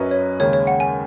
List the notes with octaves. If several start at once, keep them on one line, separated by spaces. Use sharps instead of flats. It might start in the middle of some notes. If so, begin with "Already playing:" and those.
Already playing: F#2 F#3 C#4 B4 D#5
C#5
D#2 C#3 G#3 C#5
C#5
F#5
G#5